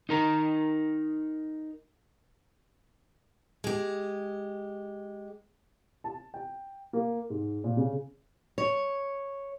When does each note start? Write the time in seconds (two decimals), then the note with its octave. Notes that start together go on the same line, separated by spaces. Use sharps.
0.09 D#4 A#4 A#5
3.64 G#3 G4
6.04 A5
6.34 G5
6.93 A#3
7.30 G#2
7.64 A#2
7.77 C#3
8.58 C#5